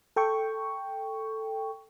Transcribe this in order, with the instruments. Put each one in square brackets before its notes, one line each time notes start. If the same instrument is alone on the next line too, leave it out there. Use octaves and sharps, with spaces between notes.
[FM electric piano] A4 G5 C#6